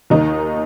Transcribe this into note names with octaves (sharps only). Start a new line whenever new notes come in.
D#2 D#3 D#4